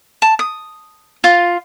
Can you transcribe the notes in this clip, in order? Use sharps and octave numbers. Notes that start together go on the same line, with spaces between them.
A5
D#6
F4